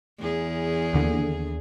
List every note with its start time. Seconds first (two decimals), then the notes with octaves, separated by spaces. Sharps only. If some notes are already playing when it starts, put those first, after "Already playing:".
0.19 E2 G#4
0.93 D#2 D3